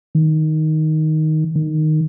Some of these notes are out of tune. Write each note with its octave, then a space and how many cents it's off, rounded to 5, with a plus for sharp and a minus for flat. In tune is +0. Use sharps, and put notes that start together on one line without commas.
D#3 +5
D#3 -10